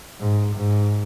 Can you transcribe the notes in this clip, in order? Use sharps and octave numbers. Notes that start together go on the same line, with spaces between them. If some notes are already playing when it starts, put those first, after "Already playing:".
G#2
G#2